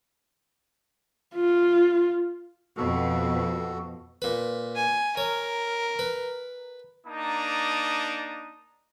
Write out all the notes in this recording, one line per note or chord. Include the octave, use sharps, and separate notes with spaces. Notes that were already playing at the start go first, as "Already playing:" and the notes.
F4
F2 B2 F#4 A4
A#2 B4
G#5
A#4 C#5
B4
A#3 D4 D#4 A5 A#5 D#6